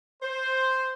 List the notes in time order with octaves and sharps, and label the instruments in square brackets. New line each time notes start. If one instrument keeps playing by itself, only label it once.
[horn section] C5